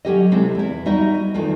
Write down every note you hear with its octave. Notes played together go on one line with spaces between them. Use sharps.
F#3 G3 C#4 G4 A4 D#5
C3 G#3 C4 E4 A4
E2 E4
G3 D#4 F#4 D#5 E5
D#5
E2 D#3 A3 F4